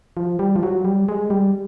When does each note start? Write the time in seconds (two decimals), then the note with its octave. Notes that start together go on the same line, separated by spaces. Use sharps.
0.17 F3
0.39 G3
0.56 F3
0.63 F#3
0.85 G3
1.09 G#3
1.30 G3